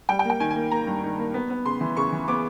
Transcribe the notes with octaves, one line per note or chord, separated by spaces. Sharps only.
G3 G5
G5
A#3
G5
D#3 G#5
G#5
A#3
A#3 A#5
G2
D#3
A#3
B3
B3
C#3 C6
E3
C#3 C#6
E3
B3 D6